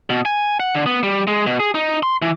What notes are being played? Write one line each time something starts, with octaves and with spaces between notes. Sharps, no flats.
B2
G#5
F#5
D3
B3
G3
G#3
B2
G#4
D#4
C6
E3